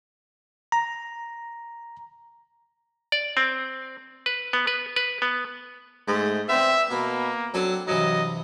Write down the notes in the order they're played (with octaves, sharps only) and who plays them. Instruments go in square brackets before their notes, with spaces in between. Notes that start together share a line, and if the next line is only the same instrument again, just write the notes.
[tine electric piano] A#5
[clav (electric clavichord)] D5
C4
B4
B3
B4
B4
B3
[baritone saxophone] G#2 [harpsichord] A3
[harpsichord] B3 D4 [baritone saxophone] C4 [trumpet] E5
[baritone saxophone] B2 [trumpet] A#3 [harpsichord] B3
[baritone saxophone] F#3 [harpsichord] C4 D4 A4
[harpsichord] G2 C3 E3 [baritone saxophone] F#3 [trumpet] D#5